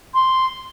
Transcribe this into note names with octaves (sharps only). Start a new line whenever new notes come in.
C6